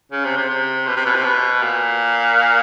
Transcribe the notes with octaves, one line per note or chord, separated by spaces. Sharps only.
C#3
C3
C3
C3
B2
C3
B2
C3
B2
A#2